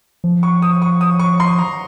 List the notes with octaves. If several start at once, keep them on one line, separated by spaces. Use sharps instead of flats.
F3
C#6
D#6
C#6
D#6
C#6
C6
A#5